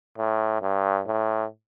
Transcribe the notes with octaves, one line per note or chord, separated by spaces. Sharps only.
A2
G2
A2